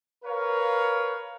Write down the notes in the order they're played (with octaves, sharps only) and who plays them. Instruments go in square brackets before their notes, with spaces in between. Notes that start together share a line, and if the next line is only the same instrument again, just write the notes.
[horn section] A#4 B4 C#5 F5